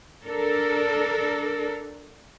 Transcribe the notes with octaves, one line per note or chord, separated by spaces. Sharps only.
D4 A4 A#4